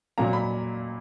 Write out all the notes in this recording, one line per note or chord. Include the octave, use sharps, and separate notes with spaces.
A#2 F#3 A#3 A#5
B5